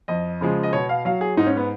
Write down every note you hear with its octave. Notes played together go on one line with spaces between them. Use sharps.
F2 D#5
C#3 F3 G#3
D#5
B2 C#5
F5
F#3 F5
G#4
G#2 D#4
C#4
B3